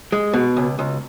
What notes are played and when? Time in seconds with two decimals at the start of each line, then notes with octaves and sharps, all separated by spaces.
0.12 G#3
0.34 B2
0.57 C#2
0.79 C#2